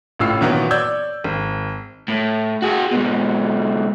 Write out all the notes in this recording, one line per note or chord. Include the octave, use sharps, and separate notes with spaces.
A1 A2 F4 E6 C7
A#2 D#3 E3 F#3 B3
C#5 D5 E6 G6 G#6
G#1
A2
F#4 G#4
G#2 B2